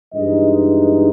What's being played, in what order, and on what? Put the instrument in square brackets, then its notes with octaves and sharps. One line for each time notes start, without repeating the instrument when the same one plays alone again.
[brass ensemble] G2 E3 G#3 D#4 D#5